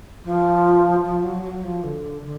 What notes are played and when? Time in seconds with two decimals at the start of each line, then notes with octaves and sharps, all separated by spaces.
0.24 F3
1.04 F3
1.23 F#3
1.43 F#3
1.64 F3
1.83 D3
2.23 D3